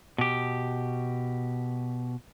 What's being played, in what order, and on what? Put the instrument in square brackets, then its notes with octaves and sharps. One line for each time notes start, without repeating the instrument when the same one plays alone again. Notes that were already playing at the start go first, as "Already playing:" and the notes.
[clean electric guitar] B2 G4